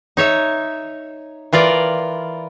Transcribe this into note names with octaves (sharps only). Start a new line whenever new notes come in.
D#4 C#5 E5
E3 F4 A#4 D5